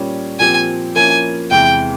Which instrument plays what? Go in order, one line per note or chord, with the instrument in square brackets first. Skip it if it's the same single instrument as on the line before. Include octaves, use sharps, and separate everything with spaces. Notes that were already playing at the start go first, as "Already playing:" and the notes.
Already playing: [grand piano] A#2 G3 C#4
[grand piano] A#2 F3 C4 G4 [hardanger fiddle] G#5
[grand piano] F3 A#3 C#4 E4 [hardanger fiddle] G#5
[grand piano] E2 C3 E3 G#3 [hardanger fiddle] G5